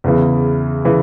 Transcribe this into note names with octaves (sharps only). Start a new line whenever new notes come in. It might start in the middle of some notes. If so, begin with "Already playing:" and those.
E2 C#3 E3
C#3 E3